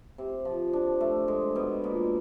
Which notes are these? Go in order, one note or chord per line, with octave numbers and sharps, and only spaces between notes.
C3
F3
D4
A3
G#3
B2
A#2